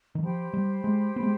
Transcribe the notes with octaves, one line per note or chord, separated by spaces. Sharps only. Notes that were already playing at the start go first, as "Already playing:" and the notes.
D#3
F3 G4 C5 G5 B5
G3
G#3
B3
G#3